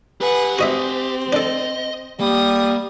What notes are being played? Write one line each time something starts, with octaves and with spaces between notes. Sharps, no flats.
G4 B4 F#5 G#5
C4 F#4 D#5 E5
D4 A4 D#5
G3 A#3 D#6